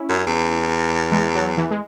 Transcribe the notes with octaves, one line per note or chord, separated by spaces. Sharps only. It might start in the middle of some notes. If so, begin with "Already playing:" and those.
Already playing: C#4 E4
F#2
E2
E3 G#3
F#3
E3
G#3